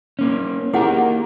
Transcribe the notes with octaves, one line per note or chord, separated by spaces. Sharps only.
A#3 C#4
A#3 E4 G4 G#4 A#4 F#5